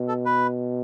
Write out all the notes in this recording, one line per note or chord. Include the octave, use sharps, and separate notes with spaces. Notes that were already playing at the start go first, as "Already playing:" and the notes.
Already playing: B2
A4
B4